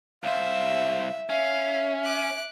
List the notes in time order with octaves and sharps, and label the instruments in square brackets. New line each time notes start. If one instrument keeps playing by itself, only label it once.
[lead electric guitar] C2 C5 [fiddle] E5 [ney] F5
[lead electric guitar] C#4 [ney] E5 [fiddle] F5
[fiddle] D6 F#6